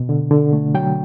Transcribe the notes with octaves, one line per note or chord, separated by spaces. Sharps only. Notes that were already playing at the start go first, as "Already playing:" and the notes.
Already playing: B2
D3
D3
A3
F#3 G5